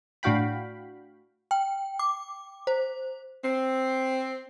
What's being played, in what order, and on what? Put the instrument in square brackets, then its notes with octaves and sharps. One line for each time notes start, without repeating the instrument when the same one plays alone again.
[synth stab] A2 D4 F#4 F5 G5 B5
[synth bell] G5
D6
C5
[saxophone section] C4